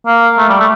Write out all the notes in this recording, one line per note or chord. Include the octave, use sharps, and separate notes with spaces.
A#3
A3
G3
A3